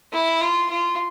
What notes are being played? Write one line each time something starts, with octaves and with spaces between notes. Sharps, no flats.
E4
F4
F4